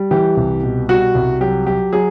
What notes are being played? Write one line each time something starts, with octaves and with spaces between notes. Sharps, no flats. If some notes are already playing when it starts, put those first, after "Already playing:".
Already playing: G3
E3 G4
C2
B2
G3 F#4
C2
F#3 G4
F#3 G4
F#3 G#4